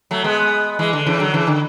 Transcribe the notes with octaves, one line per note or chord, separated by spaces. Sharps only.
F#3 A3
G#3 B3
E3 G#3
D3
C#3 E3
D3 F#3
C#3 E3
D3